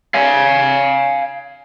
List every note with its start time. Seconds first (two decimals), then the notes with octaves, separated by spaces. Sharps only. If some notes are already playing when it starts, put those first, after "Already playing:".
0.14 F5 G#5